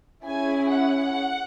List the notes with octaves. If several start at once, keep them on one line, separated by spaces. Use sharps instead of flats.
C#4 E4 G#4 G#5
F#5